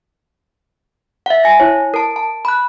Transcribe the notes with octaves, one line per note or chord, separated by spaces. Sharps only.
E5 F#5
G#5 A#6
E4 C#5
A#4 A5
A5
B5 F#6